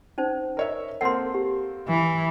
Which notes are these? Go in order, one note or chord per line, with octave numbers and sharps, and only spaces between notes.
C#4 D#4 C5
A#4 C#5 E5
A#3 C4 A4 F#5 C6
G4
E3